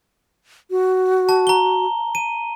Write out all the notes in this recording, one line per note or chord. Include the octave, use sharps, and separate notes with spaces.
F#4
A5
A#5 G7
D#7